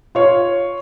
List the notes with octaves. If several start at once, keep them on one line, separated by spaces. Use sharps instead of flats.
F4 C#5